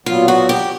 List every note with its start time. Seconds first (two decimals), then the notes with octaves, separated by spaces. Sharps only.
0.06 A#2 F#3 B3 F4
0.28 F#4
0.49 G4